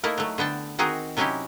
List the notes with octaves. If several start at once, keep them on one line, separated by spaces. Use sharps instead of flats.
A3 A#3 D#4 E4 A#4
F#3 A3
D3 B3 G5 A5
D#3 C4 D#4 F#4 G#4 A#4
C3 F#3 C#4 D#4 E4 G4